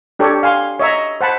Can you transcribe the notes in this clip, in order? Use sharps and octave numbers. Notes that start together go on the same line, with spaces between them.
D4 G4 A4 C#5
F5 G#5 C6
C#5 D#5 E5 A#5
C5 F#5 A5 B5